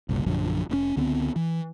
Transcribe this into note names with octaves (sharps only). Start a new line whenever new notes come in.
F#1 C2 A#2
A#1 F#2 D3 F3
F1 A2 C#4
C#2 D3 B3 C4
E3